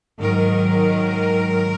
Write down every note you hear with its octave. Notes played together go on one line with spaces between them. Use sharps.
G#2 D#3 F#3 A#4